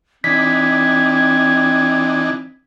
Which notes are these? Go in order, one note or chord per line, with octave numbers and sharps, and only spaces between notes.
E3 C4 D4 D#4 G#6 B6